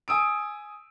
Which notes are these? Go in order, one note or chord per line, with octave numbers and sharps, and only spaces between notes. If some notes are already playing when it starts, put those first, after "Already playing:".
G#5 D#6 E6 D7